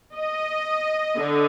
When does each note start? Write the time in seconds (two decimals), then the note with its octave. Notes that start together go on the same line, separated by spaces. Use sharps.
0.15 D#5
1.17 D3